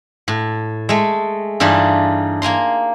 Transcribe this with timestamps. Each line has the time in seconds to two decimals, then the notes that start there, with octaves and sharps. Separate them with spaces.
0.28 A2
0.89 G#3 A3
1.60 G2 E3 D4 D#4 F4
2.42 A#3 G#5 A#5 C6